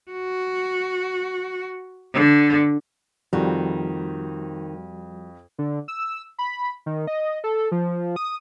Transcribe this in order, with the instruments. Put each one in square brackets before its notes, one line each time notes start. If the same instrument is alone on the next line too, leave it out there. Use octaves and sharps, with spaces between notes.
[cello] F#4
D3
[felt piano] F2 [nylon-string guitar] D#3 [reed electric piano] F3 G3 F#4
[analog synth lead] D3
E6
B5
D#3
D#5
A4
F3
D#6